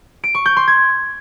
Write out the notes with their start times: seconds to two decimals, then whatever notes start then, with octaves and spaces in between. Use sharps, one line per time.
0.24 D7
0.35 C#6
0.46 G6
0.57 C6
0.68 G#6